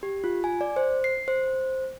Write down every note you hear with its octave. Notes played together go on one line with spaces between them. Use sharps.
G4
F4
G#5
D5
C5
C7
C5